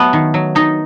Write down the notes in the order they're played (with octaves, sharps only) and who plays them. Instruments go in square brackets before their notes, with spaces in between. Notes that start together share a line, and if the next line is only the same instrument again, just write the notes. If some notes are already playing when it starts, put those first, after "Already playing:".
Already playing: [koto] F#3 A3 B3
D#3
F#3
D#3 D#4